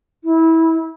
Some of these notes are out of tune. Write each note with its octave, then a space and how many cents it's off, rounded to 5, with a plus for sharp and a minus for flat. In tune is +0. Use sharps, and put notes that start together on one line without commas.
E4 -20